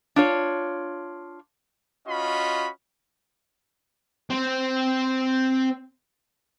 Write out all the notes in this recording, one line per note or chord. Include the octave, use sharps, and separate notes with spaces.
D4 F4 C#5
C#4 F4 F#4 D#5 B5
C4 C5